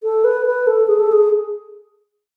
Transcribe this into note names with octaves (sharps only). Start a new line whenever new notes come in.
A4
B4
B4
A4
G#4
A4
G#4